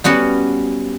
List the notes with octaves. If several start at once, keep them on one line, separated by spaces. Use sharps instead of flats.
G3 B3 C#4 F#4